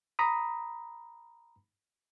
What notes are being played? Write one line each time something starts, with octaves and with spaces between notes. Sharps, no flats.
A#5 B5 D#6